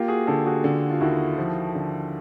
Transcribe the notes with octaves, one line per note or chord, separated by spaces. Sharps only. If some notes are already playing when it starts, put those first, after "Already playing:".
Already playing: A#3 F4 G4
F#4 G#4
D3 G4 A4
F#4 G#4
D3
F4
D#2 E4 F#4
F3
D3